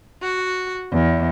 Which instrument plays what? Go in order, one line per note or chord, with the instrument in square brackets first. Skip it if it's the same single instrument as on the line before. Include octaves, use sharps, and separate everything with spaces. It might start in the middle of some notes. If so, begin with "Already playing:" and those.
[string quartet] F#4
E2